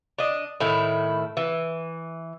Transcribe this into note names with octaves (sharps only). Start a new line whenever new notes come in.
D4 D#5
A2 D#3 E4
E3